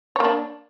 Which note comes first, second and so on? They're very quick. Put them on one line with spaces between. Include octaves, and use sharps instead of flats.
C#5 A#3 D4